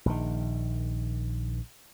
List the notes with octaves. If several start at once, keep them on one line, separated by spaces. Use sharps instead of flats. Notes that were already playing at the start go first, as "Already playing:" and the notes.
A#1 D#3